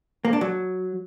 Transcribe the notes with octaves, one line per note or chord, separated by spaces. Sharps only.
A#3
D4
F#3